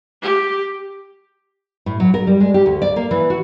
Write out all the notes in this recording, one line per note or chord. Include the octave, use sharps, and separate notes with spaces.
G4
A2
F#3
A#4
G3
G#3
G4
D2
D5
A#3
E3
F#4